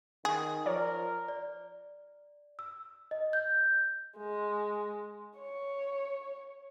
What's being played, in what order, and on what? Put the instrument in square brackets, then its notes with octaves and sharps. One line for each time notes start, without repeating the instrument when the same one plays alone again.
[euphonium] D#3 [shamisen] G#4
[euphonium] F3 [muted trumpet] A#4 [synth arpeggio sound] C#5 D5
[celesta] D5
E6
D#5
G6
[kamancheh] G#3
C#5